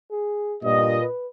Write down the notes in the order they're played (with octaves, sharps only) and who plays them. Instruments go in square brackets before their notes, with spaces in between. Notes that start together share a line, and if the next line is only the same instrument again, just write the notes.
[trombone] G#4
[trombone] G2 [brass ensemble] A#2 D#5
[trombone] B4